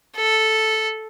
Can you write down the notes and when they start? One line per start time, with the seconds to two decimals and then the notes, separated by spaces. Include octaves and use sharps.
0.16 A4